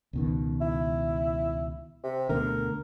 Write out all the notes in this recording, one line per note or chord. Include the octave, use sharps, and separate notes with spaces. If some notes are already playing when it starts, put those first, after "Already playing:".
C#2 B2 D#3
E4
C3
D2 B2 D3 A#4